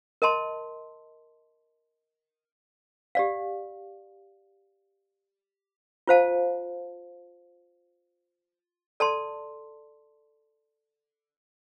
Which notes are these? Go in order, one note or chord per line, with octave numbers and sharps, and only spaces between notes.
A#4 D#5 A5 C6
G4 D5 F5
F4 C5 F5 A5
A4 D5 A5 C6